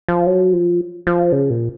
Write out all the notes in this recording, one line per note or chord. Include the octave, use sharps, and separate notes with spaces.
F3
F#3
F3
F3
C#3
A#2